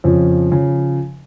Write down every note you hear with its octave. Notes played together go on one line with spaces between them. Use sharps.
F2 C#3 F3
C#3 F3